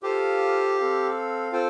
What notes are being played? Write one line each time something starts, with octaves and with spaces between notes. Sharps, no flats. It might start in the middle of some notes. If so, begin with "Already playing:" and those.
F4 G4 A4 C5 F5
C4 A4 F5
C4 F4 A4 C5 G5